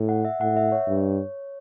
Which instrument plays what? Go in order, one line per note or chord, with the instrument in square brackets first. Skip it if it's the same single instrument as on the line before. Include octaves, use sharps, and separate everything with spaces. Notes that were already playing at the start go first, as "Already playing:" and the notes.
Already playing: [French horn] A2
[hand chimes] F#5
E5
[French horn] A2 [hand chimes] F#5
[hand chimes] E5
C#5
[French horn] G2